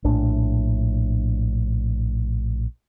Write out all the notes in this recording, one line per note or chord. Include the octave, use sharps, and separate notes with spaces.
A#1 A2 D4